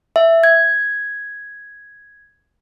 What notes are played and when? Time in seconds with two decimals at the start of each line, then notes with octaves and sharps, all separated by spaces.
0.16 E5
0.44 G#6